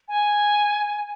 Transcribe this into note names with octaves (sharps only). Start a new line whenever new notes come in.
G#5